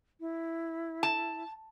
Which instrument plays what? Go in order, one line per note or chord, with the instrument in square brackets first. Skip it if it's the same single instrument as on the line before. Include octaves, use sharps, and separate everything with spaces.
[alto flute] E4
[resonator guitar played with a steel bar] A5